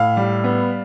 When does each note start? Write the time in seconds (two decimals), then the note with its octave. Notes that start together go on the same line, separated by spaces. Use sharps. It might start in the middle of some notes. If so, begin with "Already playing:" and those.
Already playing: A2 F5
0.17 G3
0.44 B3